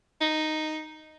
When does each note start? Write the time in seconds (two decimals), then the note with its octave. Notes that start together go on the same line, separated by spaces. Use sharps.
0.21 D#4